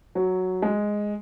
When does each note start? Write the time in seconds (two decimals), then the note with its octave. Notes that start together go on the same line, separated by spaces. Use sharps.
0.15 F#3
0.62 G#3